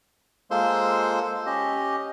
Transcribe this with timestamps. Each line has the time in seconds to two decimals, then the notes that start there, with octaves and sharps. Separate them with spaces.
0.51 G#3 A#3 F4 A4 C5 C6
1.46 C#4 G4 D#5